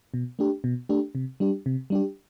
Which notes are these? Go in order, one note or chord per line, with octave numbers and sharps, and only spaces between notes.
B2
A3 D4 G4
B2
A3 D4 G4
C3
G3 D4 G4
C3
G3 D4 G4